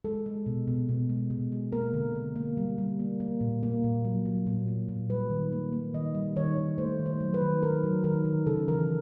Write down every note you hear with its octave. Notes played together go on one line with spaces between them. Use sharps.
G#3 A4
G#3
B2
B2
B2
G#3
B2
G#3
A#3 A#4
D3
D3
A#3
G3
G3
A#3
A#3
A#2
A#3
A#2
F#3
F#3
A#2
A#3
A#2
G3 B4
D#3
A#3
A#3
D#3 D#5
G3
D#3 C#5
D#3
A3 C5
D#3
C5
F#3
B4
D#3
D#3 A#4
F#3
D#3 A#4
D#3
C#3 A4
E3 A#4